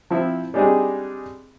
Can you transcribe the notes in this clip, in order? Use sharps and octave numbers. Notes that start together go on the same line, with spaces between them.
F3 C4 E4
G3 G#3 C4 D4 D#4 G#4